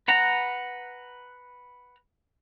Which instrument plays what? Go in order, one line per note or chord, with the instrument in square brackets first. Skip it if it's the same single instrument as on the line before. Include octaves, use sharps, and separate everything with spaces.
[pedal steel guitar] B4 F#5 A#5